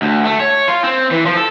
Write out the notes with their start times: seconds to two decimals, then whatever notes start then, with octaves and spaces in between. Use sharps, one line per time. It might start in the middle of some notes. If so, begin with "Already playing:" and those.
0.02 D2
0.25 A3
0.40 C#5
0.68 F4
0.84 C4
1.11 E3
1.26 F3
1.37 A4